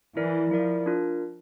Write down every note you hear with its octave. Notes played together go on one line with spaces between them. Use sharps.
E3 E4 A#4 D5
F3 E4 A#4 D5
D4 F4 A#4